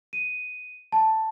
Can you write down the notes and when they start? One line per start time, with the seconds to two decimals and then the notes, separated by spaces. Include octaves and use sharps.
0.13 D#7
0.92 A5